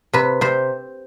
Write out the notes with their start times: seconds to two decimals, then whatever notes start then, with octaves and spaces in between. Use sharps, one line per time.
0.13 C3 B4
0.41 C3 C5